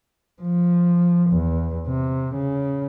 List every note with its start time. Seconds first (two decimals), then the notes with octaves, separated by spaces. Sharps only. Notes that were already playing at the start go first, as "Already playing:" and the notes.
0.42 F3
1.31 E2
1.87 C3
2.35 C#3